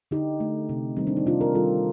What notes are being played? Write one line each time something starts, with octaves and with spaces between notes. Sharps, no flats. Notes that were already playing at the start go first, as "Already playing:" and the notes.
D3 D#4 G4
A3
C3
D#3 G3 C4
D4
D#4
C3 D4 F4
G4 A#4
D#3 G3 F4 A4